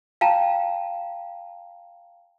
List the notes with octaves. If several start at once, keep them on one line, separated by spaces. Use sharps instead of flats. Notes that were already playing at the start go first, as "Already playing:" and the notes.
F5 G5 A5 A#5